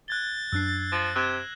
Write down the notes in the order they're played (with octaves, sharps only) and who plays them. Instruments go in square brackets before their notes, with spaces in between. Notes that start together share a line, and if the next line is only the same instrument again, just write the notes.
[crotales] F#6 G#6 G7 [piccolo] A6
[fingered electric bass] F#2 D4 [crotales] E6 F#6 C7
[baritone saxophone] F3 [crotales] A#6 F#7
[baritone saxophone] C3 [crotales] F#6 G#6 E7